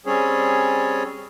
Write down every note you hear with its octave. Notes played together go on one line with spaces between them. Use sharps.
G3 C4 C#4 G#4 C#5